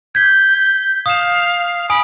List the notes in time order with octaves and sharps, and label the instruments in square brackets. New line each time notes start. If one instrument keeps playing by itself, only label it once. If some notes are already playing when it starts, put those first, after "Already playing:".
[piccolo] G6 [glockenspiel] G#6 B6
[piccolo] F5 [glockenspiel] D#6 E7
[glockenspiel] G#5 D#6 D7 [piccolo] B5